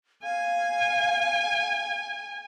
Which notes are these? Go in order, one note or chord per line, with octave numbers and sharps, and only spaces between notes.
F5 G#5